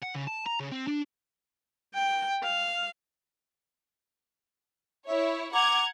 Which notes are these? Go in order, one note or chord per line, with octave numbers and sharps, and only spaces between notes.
F#5
C#3
A5
A#5
C#3
C4
D4
G5
F5
E4 C#5 E5
F#5 A#5 D6 G#6